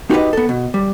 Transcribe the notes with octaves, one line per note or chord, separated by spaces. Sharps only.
D#4 F#4 G4 A4 B4 D#5
B3 A4
B2
G3